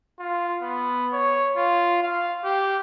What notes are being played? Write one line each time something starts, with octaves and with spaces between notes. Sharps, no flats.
F4
B3
C#5
F4
F5
G4